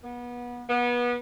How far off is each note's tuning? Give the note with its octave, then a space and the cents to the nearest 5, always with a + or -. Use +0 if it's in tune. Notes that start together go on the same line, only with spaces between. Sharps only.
B3 -25
B3 -25